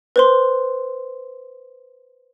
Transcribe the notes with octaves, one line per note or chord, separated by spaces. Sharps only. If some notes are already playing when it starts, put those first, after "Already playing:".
B4 C5 C6